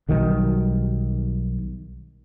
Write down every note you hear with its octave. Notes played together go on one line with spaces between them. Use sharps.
B1 D#3 F#3 G3